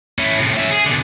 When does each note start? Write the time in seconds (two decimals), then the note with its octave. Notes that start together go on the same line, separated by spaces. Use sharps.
0.19 C#4 E4
0.39 A2 C3
0.57 C#4 E5
0.70 G#4
0.86 B2 D3